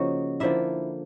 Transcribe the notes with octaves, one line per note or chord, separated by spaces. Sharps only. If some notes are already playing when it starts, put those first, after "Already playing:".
Already playing: C#3 F3 A#3 D#4 F#4
D3 F3 A#3 E4 E5